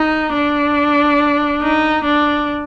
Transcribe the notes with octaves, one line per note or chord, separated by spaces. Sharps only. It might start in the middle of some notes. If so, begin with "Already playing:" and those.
Already playing: D#4
D4
D#4
D4